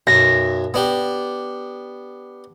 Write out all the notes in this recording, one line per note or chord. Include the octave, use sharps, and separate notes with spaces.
B1 F#2 A#6
B3 D4 G4